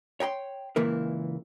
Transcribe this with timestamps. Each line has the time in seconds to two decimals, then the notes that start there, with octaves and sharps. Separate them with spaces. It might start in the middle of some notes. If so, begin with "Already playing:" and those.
0.20 C#5 G5 A#5 C6
0.76 C#2 A#2 E3 A#3 E4 A#4